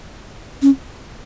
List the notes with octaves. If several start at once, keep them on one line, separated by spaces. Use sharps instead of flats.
C#4